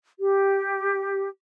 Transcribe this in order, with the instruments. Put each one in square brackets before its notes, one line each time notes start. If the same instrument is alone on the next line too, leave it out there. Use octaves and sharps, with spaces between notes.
[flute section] G4